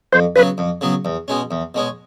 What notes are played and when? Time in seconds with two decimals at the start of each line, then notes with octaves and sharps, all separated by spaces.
0.13 F2 C5
0.36 C#3 F#3 B3 B4
0.58 F2
0.81 C#3 F#3 B3
1.05 E2
1.28 B2 G#3 C#4
1.51 E2
1.75 B2 G#3 C#4